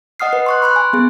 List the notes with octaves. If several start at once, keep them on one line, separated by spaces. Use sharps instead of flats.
D#5 F#5 D#6 F6 C7
B4
C6 C#6 F#6
B5 C6 F#6
G#5
B3 G#4